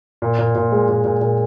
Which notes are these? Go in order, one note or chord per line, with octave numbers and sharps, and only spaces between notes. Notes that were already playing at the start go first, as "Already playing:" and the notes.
A#2
A#2
A#2
G#3
A#2
A#2
A#2